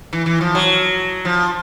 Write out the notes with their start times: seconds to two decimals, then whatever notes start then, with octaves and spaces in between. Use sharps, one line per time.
0.13 E3
0.26 E3
0.41 F3
0.55 F#3
1.25 F3